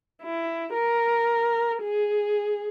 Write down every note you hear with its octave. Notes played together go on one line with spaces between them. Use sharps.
E4
A#4
G#4